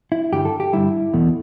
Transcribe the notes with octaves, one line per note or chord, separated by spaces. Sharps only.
E4
G2 D3 G3 G4
A4
G4
G2 D3 G3 E4
E2 B2 A3